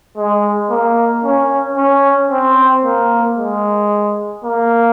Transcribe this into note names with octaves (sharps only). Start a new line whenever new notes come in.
G#3
A#3
C#4
C#4
C4
A#3
G#3
A#3